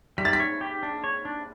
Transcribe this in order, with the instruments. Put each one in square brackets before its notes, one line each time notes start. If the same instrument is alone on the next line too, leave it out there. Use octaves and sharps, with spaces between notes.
[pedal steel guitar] G3 [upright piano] B6
[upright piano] A6
B6
[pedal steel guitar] C#5
G4
D4
C#5
D4